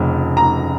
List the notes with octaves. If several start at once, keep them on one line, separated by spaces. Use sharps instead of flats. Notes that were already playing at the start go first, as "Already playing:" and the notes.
Already playing: F1 F2 C#3
A#5